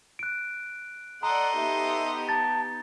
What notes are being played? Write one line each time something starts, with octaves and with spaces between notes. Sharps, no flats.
F#6 D7
A4 D5 D#5 F#5 A#5 C6
B3 D#4 G4 E5
A5 A6